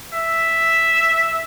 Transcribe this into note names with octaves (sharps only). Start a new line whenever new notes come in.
E5